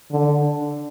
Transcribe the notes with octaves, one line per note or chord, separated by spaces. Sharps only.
D3